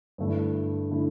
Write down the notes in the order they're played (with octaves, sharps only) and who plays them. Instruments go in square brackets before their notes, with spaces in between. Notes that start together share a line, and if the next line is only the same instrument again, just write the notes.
[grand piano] G2 D3 A3 E4
D3 A3 E4